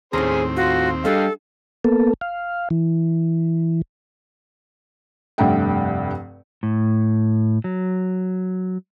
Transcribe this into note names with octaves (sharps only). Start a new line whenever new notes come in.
D#2 A2 C4 C#4 G#4 A4 C5 A#5
F4 F#4
G3 D4 G#4 A4 D#5 F5 G5
A#3 B3 A4
F5
E3
F1 G2 A3 F#5 G5
A2
F#3